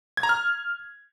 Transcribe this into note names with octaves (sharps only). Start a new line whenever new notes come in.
G#6
A#5
F6